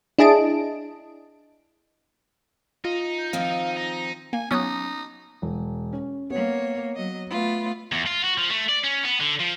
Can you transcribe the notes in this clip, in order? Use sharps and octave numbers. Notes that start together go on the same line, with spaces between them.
D4 E4 G#4 D#5 A5 D7
D#4 F4
G6
D#3 F3 C4 F5
D#4
D#4 A#6
A#3 G#5
F#3 B3 C#4 D#4 C#6 D#6 F#6
E1
C#4
A#3 B3 C#5
F#3 D#5
A3 B3 F4
E2
F4
F#4
F3
A3
D5
C#4
B3
D3
F3